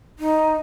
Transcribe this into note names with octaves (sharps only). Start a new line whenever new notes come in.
D#4